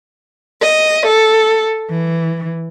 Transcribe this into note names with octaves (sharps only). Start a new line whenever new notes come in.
D#5
A4
E3